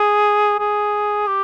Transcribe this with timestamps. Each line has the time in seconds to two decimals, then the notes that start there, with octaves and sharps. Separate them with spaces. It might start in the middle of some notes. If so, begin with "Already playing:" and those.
Already playing: G#4
0.59 G#4
1.27 G4